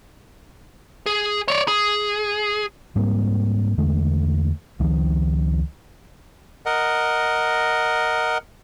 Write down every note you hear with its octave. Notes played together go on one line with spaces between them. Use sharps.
G#4
C#5 D5
G#4
G#2 G3 A#3 C4
E2 D3 G#3 A3
C#2 D#3 F3
A#4 D#5 F#5